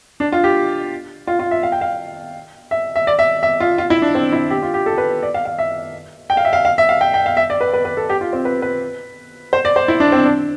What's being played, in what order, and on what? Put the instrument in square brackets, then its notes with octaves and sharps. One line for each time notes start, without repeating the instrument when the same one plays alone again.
[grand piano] D4
F4
G4
F4
F4
E5
F5
G5
F5
E5
E5
D5
E5
E5
F4
F4
E4
D4
C4
E4
G4
F4
G4
A4
B4
D5
F5
F5
E5
G5
F5
E5
F5
F5
E5
F5
G5
G5
F5
E5
D5
B4
B4
B4
A4
G4
F4
C4
B4
B4
C5
D5
C5
E4
D4
C4
D4